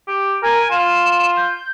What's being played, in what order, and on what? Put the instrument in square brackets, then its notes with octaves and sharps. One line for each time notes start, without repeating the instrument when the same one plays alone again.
[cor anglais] G4
[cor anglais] A#4 [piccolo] G#5
[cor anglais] F4 [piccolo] E7
[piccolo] G6